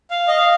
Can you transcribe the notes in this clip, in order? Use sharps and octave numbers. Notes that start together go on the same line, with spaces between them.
F5
D#5
F5